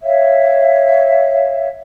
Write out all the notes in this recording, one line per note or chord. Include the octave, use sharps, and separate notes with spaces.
C#5 E5 F5